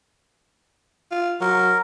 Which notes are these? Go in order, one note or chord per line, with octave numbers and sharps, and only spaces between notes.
F4
F#3 A#4